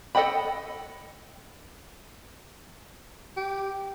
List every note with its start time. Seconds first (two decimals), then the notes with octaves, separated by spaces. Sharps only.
0.15 A4 D#5 F#5 G5 B5
3.37 G4